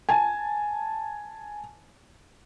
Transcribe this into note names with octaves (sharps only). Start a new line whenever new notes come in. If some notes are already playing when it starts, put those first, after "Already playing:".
G#5 A5